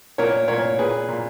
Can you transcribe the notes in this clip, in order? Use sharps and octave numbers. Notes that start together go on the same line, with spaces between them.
A#2 A#4 C#5
A#2 A#4 C#5
A#2 G#4 B4
A#2